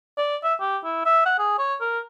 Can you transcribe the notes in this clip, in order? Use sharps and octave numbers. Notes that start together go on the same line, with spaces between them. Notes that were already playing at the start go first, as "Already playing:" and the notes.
D5
E5
G4
E4
E5
F#5
G#4
C#5
A#4